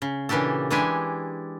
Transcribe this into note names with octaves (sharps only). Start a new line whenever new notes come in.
C#3
A#2 C#3 E3 D4 G4 A4
E3 G#3 D4 E4 G4 G#5